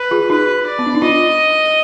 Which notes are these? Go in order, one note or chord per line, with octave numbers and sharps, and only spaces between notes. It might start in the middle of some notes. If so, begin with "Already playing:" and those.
Already playing: B4
F4 G#4
D#4 F#4 B4
D5
B3
D4
D#4
D4 F4 D#5